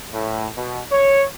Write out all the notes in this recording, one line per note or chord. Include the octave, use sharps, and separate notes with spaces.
A2
B2
C#5